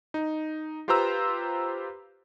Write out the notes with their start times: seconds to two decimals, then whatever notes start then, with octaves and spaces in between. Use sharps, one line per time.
0.14 D#4
0.88 F4 G4 B4 C5 A#5 E6